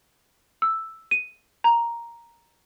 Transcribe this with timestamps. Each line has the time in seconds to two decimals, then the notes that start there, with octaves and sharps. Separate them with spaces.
0.62 E6
1.11 D#7
1.64 A#5